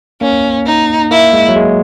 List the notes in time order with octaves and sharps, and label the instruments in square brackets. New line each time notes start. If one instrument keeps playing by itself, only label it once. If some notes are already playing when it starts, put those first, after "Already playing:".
[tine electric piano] A#3 [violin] C#4
[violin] D#4
[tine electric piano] A#3 [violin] E4
[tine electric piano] G#3
F#3
G#3